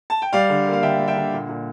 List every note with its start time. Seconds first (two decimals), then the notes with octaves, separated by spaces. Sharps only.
0.10 A5
0.22 G5
0.33 G3 D5 F5
0.49 D3
0.67 A#3
0.73 F5
0.82 D3 E5 G5
0.99 G3
1.07 E5 G5
1.17 D3
1.33 A#2
1.49 A#2